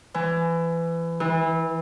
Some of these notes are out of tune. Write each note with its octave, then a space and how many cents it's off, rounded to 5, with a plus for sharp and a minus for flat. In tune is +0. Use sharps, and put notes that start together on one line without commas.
E3 +25
E3 -20